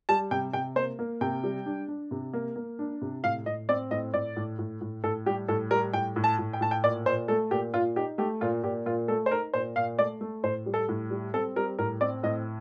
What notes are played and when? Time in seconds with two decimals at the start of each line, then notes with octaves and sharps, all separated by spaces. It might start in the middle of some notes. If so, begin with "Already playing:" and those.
0.09 G3 A5
0.31 C3 G5
0.53 C3 G5
0.76 A#3 C5
0.99 A#3
1.21 C3 G5
1.43 G3
1.66 D4
1.88 D4
2.11 C3
2.33 A#3
2.56 A#3
2.79 D4
3.02 C3
3.23 A2 F5
3.46 A2 D#5
3.69 C4 D5
3.91 A2 D#5
4.13 A2 D5
4.36 A2
4.59 A2
4.81 A2
5.04 A2 A4
5.26 G3 G4
5.48 A2 A4
5.71 G3 A#4
5.93 A2 G5
6.16 A2
6.24 A5
6.39 A2
6.53 G5
6.61 A2 A5
6.71 G5
6.84 A#2 D5
7.06 A#2 C5
7.28 A3 A4
7.51 A#2 G4
7.74 A#2 F4
7.96 D#4 G4
8.18 A3 G4
8.41 A#2 F4
8.63 A#2 G4
8.86 A#2 F4
9.08 A3 A4
9.26 C5
9.31 D#4 A#4
9.53 A#2 C5
9.76 A#2 F5
9.99 A3 D5
10.21 A3
10.43 A2 C5
10.66 G3
10.74 A4
10.89 A2
11.10 G3
11.34 C4 A4
11.56 G3 A#4
11.79 A2 A#4
12.01 C4 D5
12.23 A2 D#5